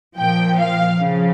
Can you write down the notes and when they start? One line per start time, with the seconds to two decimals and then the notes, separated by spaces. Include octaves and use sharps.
0.17 A#2 F3 G5
0.58 F5
0.98 C#3 F3